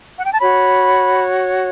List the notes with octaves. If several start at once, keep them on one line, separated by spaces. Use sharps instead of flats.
F#5
G5
A5
F#4 C#5 B5